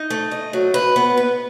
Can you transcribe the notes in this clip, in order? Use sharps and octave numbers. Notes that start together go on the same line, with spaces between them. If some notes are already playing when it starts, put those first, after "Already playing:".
Already playing: D#4
A3
D#5
F#3
B4
B3
B4